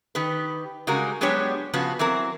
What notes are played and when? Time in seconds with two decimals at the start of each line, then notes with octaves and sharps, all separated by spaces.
0.15 D#3 G4 B4
0.87 C#3 G3 G#3 F#4 A#4
1.21 F#3 G#3 B3 D4 G4 C#5
1.73 C#3 F3 B3 F#4
1.99 E3 F#3 C4 A#4